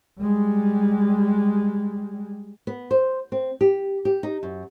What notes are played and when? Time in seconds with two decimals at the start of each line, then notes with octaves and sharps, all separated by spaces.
0.21 G3 G#3
2.67 B3
2.91 C5
3.32 C4
3.61 G4
4.05 G4
4.23 D#4
4.43 F#2